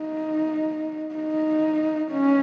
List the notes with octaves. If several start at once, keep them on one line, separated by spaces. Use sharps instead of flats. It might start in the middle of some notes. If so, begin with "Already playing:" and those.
Already playing: D#4
D#4
C#4